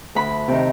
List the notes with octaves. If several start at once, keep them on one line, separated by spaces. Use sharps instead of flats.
D2 B5
C3 D#3